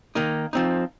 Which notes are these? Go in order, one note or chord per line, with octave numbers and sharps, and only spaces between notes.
D#3 A#3 D#4
F3 C4 D#4